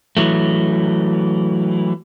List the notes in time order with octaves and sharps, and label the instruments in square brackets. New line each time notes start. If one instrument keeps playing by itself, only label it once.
[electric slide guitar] E3 F#3 A3